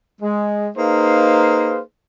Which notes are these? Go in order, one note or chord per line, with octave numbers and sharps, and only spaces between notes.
G#3
A#3 D#4 G#4 B4 C5 F5